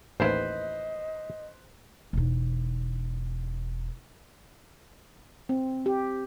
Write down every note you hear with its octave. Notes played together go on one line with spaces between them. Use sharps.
A1 D#2 E4 B4 C5 D#5
E1 D#4
C4
G4